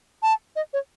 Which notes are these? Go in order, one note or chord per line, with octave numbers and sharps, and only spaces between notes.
A5
D#5
C#5